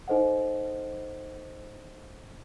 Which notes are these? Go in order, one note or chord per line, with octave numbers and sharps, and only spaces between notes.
D#4 A4 C5 D#5 F#5